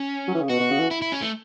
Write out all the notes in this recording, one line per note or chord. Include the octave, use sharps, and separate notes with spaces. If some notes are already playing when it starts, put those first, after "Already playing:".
Already playing: C#4
F#3
E3
C#3
B2 F#4
B2
C#3
E3
E4
E4
C#4
A3